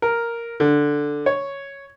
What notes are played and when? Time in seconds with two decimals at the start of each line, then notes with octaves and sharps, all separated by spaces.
0.02 A#4
0.60 D3
1.26 C#5